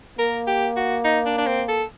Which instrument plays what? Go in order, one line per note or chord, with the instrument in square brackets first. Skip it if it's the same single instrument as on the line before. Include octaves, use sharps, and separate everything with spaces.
[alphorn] A#3 [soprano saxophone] A#4
[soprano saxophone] G4
F#4
D#4
D4
D4
C4
A4